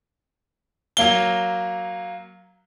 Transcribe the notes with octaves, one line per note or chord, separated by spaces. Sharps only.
F#3 A#3 G7